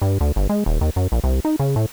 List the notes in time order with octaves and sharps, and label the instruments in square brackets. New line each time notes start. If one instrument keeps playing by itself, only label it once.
[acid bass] G2
D2
G1
G#3
D#1
D#2
F#2
A#1
C2
D#4
C#3
A2